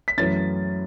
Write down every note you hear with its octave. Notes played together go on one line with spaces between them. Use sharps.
B6
F#2 E3 A3 C#4 A6